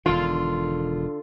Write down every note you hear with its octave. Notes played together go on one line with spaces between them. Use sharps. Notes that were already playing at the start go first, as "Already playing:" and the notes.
E1 D3 D#3 F4